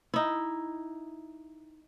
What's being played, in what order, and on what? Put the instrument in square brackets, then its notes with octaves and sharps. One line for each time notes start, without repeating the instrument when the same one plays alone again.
[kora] D#4 E4